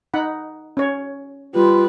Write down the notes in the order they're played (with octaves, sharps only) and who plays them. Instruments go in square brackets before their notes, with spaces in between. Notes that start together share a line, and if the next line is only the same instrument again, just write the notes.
[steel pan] D#4 F#5 B5
C#4 C#5
[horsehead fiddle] G3 B4 [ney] F4